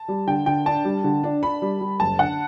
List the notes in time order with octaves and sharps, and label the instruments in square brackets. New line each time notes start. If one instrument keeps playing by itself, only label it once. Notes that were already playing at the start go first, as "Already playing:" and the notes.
Already playing: [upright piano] A5
[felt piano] G3
[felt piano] D3 [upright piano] G5
[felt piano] D3 [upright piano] G5
[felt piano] D4 [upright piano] A5
[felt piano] G3
D3
D4
[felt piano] D4 [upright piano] B5
[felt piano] G3
G3
[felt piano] F#1 [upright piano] A5
[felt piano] D3 [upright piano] F#5